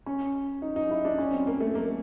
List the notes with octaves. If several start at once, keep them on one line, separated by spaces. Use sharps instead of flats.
C#4
D#4
D#4
E4
D4
C#4
C4
A#3
A3
A#3